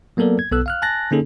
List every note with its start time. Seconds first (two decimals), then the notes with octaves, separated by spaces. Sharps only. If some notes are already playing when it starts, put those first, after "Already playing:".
0.17 F#3 A#3 B3 A4 A#4 D5
0.39 G#6
0.51 B1 B3 A4 E6 F#6
0.66 F5 F6 F#6
0.82 G#5 A5 F#6 A6 A#6
1.11 D3 A#3 C#4 D#4 G#4 A4